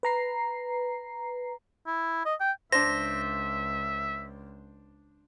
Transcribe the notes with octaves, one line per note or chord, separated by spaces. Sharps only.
B4 A#5 C7
E4
D#5
G5
C#2 D4 C5 E5 A#6